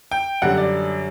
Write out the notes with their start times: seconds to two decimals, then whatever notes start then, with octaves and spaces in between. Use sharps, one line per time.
0.11 G5
0.42 F#2 D3 G3 F#5
0.58 D5